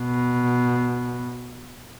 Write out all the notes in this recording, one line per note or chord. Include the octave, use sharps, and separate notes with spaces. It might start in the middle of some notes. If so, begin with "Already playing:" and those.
Already playing: B2